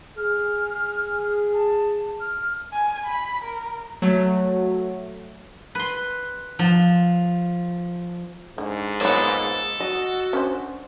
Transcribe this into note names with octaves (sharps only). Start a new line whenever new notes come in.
G#4 F6
A5
F6
G#5
B5
A#4
F#3 A3
B4 C6
F3
G#2 D3
A#3 B3 F4 A4 C#5
F#4 D#5
C#4 D4 C5